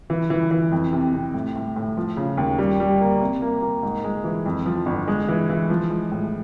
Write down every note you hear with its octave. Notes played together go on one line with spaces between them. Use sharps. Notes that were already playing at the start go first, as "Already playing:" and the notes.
E3
E3
E3
F2
C3
C3
A2
A2
A2
F3
C#3
D#2
G3
G3
A#3
C3
A#3
A#3
G#2
G#3
E3
F2
F3
G1
G#3
E3
E3
F3
G#3
A2